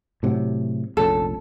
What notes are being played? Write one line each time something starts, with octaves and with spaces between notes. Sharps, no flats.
A2 C3 F#3
F1 A#1 C#4 A4